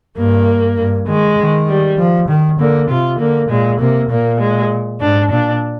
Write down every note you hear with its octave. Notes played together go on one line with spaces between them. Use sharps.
G2 A#3
G2
D#3 G#3
D#3
G3
F3
D#3
D3 A#3
C3 F4
D3 A#3
A#2 G#3
C3 A#3
A#2 A#3
G#3
G#2 D4
A#2 D4